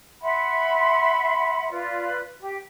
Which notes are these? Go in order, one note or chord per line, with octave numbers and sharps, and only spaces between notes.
E5 F#5 B5 C6
F4 B4 D5
G4